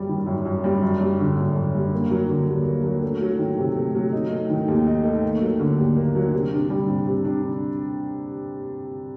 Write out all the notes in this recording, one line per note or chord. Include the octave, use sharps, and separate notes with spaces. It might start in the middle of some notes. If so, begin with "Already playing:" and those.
Already playing: F#2 G3
D#3
F#2
F#2
G3
F#2
G3
D3
F#2
F#2
G3
A#3
F#3
D3
D#2
A#3
F#3
A3
F#3
D#3
C3
A3
F#3
D#4
A3
D#3
D#2
D#4
A3
A#3
F#3
D3
D#2
A#3
F#3
C3
D4
G3
C3
C3
D4